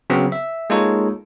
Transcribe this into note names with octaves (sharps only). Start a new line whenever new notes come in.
C#3 F#3 B3 C4
E5
G#3 A#3 D#4 F4 A4 C#5